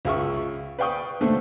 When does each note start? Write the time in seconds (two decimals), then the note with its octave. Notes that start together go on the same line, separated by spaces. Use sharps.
0.05 C#2 F4 G#4 E5 C#6
0.79 B4 D5 F5 G5 C#6 D#6
1.20 D#2 B2 D3 A3 C5